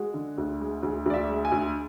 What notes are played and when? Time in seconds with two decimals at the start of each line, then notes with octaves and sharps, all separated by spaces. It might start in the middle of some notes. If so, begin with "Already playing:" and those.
Already playing: G#3 F#4
0.14 D3
0.38 D2
0.61 G#3
0.83 D2 G#4
1.06 D2 D5
1.14 E5
1.29 G#3
1.45 G#5
1.52 D2